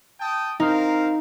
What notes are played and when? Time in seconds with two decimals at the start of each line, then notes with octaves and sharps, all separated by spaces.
0.20 G5 A5 D#6
0.60 C4 D#4 A#4 F5